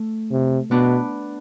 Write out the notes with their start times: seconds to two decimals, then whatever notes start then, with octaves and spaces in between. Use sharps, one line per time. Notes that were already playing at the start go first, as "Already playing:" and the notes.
Already playing: A3
0.31 C3
0.71 B2 B3 D4